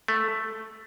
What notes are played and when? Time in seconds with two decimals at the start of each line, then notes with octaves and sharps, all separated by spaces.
0.08 A3